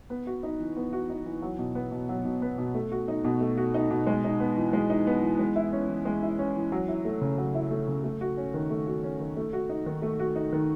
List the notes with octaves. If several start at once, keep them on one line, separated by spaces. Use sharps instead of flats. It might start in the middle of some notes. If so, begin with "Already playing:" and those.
B3
F#4
D#4
E3
B3
F#4
D#4
E3
F#3
B2
B3
B2
F#3
B2
B3
B2
A3
F#4
D#4
B2
A3
F#4
D#4
B2
G#3
D#4
B3
E3
G#3
D#4
B3
E3
G#3
E4
C#4
E3
G#3
E4
C#4
E3
F#3
E4
A3
C#3
F#3
E4
A3
C#3
A3
F#4
C#4
D#3
A3
F#4
C#4
D#3
A3
F#4
D#4
D#3
A3
F#4
D#4
D#3